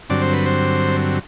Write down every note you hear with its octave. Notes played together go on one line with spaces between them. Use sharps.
G2 D3 F#3 C4 D5
C5
B4
C5